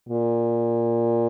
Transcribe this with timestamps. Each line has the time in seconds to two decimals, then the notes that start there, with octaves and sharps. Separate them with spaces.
0.09 A#2